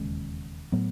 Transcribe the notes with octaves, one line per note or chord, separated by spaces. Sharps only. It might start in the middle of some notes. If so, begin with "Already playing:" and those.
Already playing: E1 D#2 C#3 G#3
A2 F#3 B3